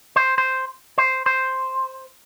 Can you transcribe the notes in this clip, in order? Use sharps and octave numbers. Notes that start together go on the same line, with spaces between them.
C5
C5
C5
C5